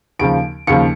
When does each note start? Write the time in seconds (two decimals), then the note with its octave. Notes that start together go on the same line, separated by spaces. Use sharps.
0.19 D#2 C#3 F3 D7
0.67 D#2 C#3 F3 C#7